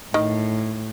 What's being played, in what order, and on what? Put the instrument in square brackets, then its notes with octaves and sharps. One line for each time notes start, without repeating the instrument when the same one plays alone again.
[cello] A2 [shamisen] D#3